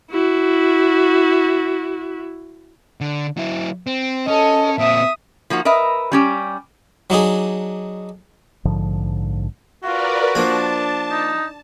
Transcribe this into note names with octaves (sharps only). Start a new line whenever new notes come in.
E4 F#4
D3
F#3 E4
C4
C#4 A4 D#5
A#2 C4 E5 D#6
F3 A#3 D#4 F#4
A#4 B4 D#5 E5
G3 C#4 G4
F#3 D4 D#4 G#4
A#1 G#2 D3 F3
F4 F#4 A#4 B4 D5
F3 A#3 D4 F4 A5
D#4